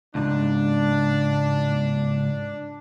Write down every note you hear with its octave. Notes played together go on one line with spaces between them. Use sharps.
C#2 G#2 D4